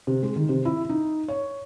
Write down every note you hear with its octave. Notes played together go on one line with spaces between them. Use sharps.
C3
G#3
D#3
C3
E4
D#4
C#5